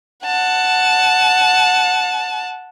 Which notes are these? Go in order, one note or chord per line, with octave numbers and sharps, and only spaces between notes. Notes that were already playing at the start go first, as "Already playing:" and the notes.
F#5 A5